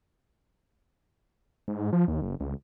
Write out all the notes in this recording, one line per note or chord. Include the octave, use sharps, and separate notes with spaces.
G#2
F3
D#2
F#1
C#2